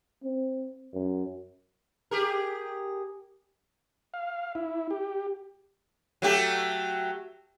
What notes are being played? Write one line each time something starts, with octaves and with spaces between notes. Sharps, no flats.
C4
F#2
G4 G#4 A#4
F5
E4
G4
F#3 A3 G4